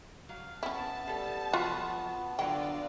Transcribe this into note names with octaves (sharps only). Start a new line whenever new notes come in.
F#3 F5
B3 C#4 E4 A5
G3 A4
F3 F#3 F4 F#4 B4
D3 F#3 F4 D5 G5